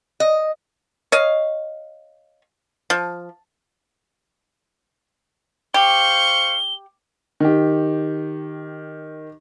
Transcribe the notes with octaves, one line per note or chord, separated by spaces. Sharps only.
D#5
C#5 D#5 F5
F3
G4 C5 F5 C#6 G7
D#3 G4